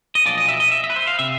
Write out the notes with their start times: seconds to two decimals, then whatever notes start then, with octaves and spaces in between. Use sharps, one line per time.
0.15 D#5
0.26 B1 A#2 F3 D5
0.38 D#5
0.49 E5
0.60 D#5
0.72 E5
0.84 E5
0.90 B4
0.96 C5
1.07 F5
1.19 C3 E5